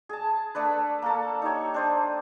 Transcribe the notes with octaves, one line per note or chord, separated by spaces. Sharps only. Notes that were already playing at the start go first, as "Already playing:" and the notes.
G#4 A5
A3 D4 B4
A#3 A4
D#4 G4 C#5
D4 C5 D#6